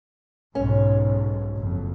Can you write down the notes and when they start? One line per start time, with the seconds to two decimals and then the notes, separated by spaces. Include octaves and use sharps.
0.55 B1 G#2 C#4
1.56 F#1 F2